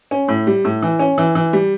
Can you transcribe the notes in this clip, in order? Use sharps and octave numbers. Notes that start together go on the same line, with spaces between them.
C#4
A2
G3
A2
E3
C#4
E3
E3
G3